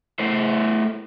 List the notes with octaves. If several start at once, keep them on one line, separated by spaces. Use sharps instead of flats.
A3 E4 A4 C5